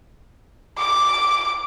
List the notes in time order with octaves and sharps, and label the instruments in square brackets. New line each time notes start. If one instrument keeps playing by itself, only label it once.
[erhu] D6